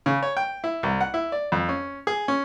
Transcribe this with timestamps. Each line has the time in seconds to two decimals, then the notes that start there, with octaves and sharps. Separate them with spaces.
0.06 C#3
0.23 C#5
0.37 G5
0.64 E4
0.83 C2
1.01 F#5
1.14 E4
1.32 D5
1.52 F2
1.69 C#4
2.07 G#4
2.28 C#4